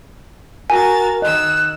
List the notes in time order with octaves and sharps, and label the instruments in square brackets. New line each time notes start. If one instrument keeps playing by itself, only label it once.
[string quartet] F#4 A#5 A6 [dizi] A#4 [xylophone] G#5
[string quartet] D#3 E6 [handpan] D#5 [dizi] F#6